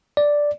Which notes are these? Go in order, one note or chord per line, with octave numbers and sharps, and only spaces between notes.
D5